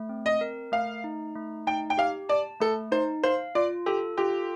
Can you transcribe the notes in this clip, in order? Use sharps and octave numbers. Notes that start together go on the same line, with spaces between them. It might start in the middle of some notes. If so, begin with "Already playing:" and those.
Already playing: A3
C4
D#5
A#4
A3 F5
D#4
A3
D#4 G5
G5
G4 F5
D5 A5
A3 A4
D#4 C5
C5 F5
F4 D5
G4 A4
F4 G4